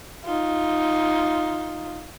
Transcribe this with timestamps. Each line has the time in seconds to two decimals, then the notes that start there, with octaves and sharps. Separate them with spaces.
0.25 D#4 F4